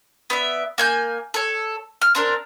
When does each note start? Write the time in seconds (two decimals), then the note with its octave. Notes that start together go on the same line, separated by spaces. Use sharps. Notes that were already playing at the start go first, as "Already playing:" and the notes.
0.30 B3 D5 E5
0.78 A#3 G#5 G6
1.34 A4 C#5
2.02 F6
2.15 C4 D4 A#4